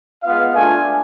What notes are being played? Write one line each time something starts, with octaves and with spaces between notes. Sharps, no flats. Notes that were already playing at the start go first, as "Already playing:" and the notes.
G#3 B3 F4 F5
A3 D4 F4 G#5